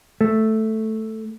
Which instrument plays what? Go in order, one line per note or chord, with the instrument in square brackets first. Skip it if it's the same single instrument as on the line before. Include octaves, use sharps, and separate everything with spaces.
[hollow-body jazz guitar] A3